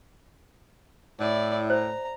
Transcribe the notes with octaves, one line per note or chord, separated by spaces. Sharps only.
A2 E4 D5
C5 A#5